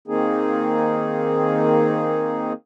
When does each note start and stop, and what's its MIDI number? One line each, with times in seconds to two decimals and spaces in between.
0.08 2.53 51
0.08 2.53 58
0.08 2.53 60
0.08 2.53 63
0.08 2.53 68